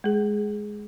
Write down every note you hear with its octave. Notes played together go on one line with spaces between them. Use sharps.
G#3 G#4